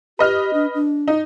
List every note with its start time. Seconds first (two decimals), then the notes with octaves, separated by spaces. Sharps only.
0.19 G4 B4 D#5 F6
0.54 D4
0.75 D4
1.08 D#4